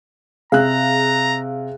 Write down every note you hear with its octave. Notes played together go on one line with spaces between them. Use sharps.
C3 G#4 F5 A#5 F#6